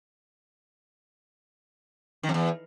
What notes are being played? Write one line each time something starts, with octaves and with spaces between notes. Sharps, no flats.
D#3
F2
E2